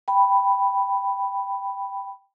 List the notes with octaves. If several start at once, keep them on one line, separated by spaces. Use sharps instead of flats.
G5 B5